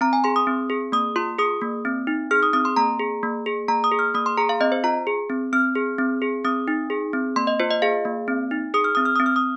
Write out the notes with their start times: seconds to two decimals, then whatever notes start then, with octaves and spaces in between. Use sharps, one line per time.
0.01 C4 A#5
0.13 G#5
0.24 G#4 C6
0.36 D#6
0.47 C4
0.70 G#4
0.92 A#3 D#6
1.16 F4 C6
1.38 G#4 D#6
1.61 A#3
1.85 C4
2.07 D#4
2.31 G#4 F6
2.43 D#6
2.53 C4 D#6
2.65 C6
2.76 A#3 A#5
2.99 G#4
3.23 A#3
3.46 G#4
3.68 A#3 A#5
3.84 D#6
3.92 G#4
3.99 F6
4.14 A#3 D#6
4.26 C6
4.37 G#4 A#5
4.49 F5
4.60 C4 D#5
4.72 C5
4.84 F4 A#5
5.07 G#4
5.30 C4
5.53 C4 F6
5.75 G#4
5.98 C4
6.22 G#4
6.44 C4 D#6
6.68 D#4
6.90 G#4
7.13 C4
7.36 A#3 C6
7.47 D#5
7.60 F4 C5
7.71 D#5
7.82 G#4 F5
8.05 A#3
8.28 C4
8.51 D#4
8.74 G#4 D#6
8.84 F6
8.95 C4 D#6
9.05 F6
9.16 C4 D#6
9.26 F6
9.36 D#6